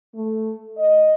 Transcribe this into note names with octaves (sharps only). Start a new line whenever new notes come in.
A3
D#5